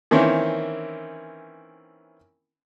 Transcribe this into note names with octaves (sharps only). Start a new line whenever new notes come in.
D#3 E3 A#3 C4 C#4 E4